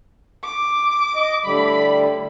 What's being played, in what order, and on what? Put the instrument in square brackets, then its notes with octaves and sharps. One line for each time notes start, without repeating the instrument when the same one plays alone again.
[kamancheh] D6
[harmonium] D#5
[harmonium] A2 D3 G3 [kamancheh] B5